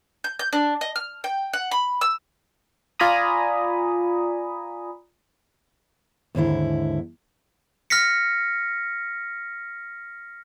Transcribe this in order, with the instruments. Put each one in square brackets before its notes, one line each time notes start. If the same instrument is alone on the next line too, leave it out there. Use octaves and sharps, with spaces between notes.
[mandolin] G6
G6
D4
D#5
F6
G5
F#5
B5
E6
[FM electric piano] F4 D5 G#5 A#5 B5 D#6
[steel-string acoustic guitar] D#2 G#2 D3 E4
[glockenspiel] F6 A#6 B6 C#7